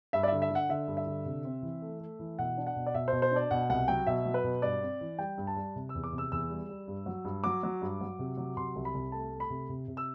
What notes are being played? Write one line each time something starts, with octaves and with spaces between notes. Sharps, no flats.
G2 E5
D5
D3 E5
E5
D3 F#5
D3 E5
G2
E5
D3
C3
C4
E3
A3
A3
E3
B2 F#5
D4
F#5
B2
D5
B2 E5
B2 C5
C5
D4
D5
B2 F#5
C2 F#5
F#3 G5
B2 E5
F#3
B4
B2
G2 D5
C4
E3
G3 G5
G2
A5
G3
C3
E6
E2
D6
C3
E6
E2 E6
G3
G3
G2
F#3
G2
F#3 D6
F#3
G2
F#3
C3
F#3
C3 C6
C2
B5
C2
A3 A5
A3
B5
C3
C3
C3
E6